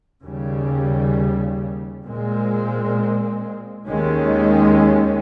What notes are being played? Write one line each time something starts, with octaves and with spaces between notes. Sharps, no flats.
D#2 C#3 G3
A#2 G#3 C4
D#2 D#3 G#3 C#4